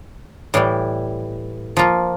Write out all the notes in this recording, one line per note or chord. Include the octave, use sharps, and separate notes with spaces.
A2 E3 G3
F3 A#3 F4